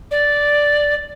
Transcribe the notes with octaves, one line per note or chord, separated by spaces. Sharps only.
D5